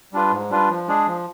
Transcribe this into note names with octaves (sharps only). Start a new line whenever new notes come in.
G3 D4 F4 B4
G#2
G3 D4 F4 B4
F3
G#3 D4 G#4
F3